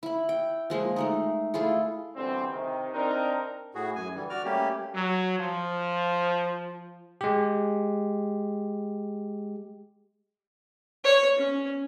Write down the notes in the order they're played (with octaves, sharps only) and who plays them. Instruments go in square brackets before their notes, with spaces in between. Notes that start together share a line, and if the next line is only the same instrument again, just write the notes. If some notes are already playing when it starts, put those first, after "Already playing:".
[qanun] E4 B5
G5
F3 G#3 A#3
G#3 A3 D#4
A3 E4 F4 G#4
[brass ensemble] B2 D3 E3 G3 C4
C3 D#3
C4 D4 D#4 A#4
[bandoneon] A2 F#4 G#4
F#2 G#5
D3 E3 G3
F#4 D5 F6
G3 A3 A#3 C#4 G4
[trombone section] F#3
F3
[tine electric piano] G#3 G4
[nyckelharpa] C#5
C#4